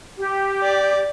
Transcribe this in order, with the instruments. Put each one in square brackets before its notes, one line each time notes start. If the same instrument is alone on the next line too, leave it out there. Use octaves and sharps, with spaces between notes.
[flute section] G4
[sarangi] D5